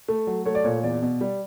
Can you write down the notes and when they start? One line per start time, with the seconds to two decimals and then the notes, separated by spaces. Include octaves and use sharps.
0.08 A3
0.27 F#3
0.45 A3 C#5
0.55 D5
0.64 A#2 C#5
0.83 E2 D5
1.02 B2
1.21 G3